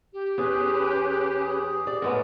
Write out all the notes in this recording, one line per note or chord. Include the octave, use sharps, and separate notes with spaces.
G4
E2 C#4 G#4 B4
D5
F#2 A2 G#3 B3 A#4